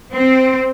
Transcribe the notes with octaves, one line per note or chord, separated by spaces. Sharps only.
C4